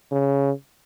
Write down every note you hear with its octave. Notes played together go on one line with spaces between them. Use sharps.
C#3